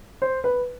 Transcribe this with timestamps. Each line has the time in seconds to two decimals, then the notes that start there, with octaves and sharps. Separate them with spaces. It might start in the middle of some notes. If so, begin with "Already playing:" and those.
0.22 C5
0.44 B4